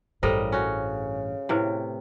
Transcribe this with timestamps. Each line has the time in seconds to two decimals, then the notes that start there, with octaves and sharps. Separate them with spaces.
0.23 A1 G2 C#3 G3 A4 A#4 C5 D#5
0.52 C#4 F#4
1.49 A2 C3 E4 B4 G#5